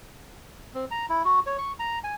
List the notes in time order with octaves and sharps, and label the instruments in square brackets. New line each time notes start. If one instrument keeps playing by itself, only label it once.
[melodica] C4
A#5
E4
F#4
C#5
C#6
A#5
G#5